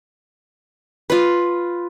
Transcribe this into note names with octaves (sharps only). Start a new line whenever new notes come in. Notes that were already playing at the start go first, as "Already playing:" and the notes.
F4 B4